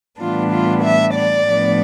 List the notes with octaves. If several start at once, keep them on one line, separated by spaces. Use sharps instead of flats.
A2 E3 G3 B3 D4 F4
F4
E5
D5
A2 F3 B3 D4